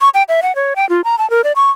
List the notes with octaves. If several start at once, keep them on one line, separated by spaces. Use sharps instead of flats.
C#6
G5
E5
F#5
C#5
G5
F4
A#5
A5
A#4
D5
C#6